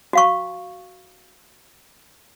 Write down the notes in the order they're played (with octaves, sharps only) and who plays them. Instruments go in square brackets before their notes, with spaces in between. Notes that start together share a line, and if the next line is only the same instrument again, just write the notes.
[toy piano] F#4 F5 C#6